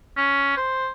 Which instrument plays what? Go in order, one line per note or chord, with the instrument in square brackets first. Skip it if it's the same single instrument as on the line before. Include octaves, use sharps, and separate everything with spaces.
[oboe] C#4
C5